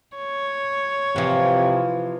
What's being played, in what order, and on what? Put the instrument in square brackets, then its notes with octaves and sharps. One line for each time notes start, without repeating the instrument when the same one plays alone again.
[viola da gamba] C#5
[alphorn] C3 [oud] E3 F3